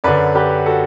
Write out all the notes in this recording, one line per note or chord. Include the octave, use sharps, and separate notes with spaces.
F#2 D3 B4 D5
G4 B4
F#4 A4